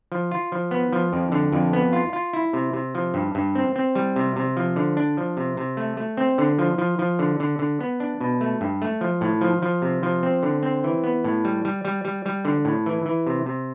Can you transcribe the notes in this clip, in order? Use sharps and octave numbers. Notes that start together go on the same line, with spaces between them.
F3
F4
F3
B3
F3
F2
D3
F2
B3
F4
F4
E4
C3
C3
F3
G2
G2
C4
C4
G3
C3
C3
F3
D3
D4
F3
C3
C3
A3
A3
C4
D3
F3
F3
F3
D3
D3
D3
B3
D4
B2
A3
G2
A3
F3
A2
F3
F3
C3
F3
C4
D3
C4
E3
B3
A2
G3
G3
G3
G3
G3
D3
A2
E3
E3
C3
C3